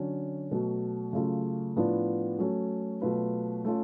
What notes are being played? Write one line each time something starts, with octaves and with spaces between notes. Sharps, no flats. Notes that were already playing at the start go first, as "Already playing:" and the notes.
Already playing: D3 F#3 C#4
B2 F#3 A3
C#3 F#3 A3 F4
A2 F3 B3 D4 F4
F#3 A3 C#4
B2 F#3 A3 F4 B4
A3 C#4 F4